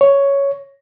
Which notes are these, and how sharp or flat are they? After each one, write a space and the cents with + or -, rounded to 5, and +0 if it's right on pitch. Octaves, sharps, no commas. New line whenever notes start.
C#5 +5